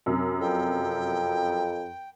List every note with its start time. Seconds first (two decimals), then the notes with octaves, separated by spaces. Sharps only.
0.06 F#2 C3
0.40 F2 G5